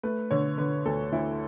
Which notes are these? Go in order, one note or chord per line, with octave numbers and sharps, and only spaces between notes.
A3 B4
D3 C#5
D3 B4
D2 A4
D2 E4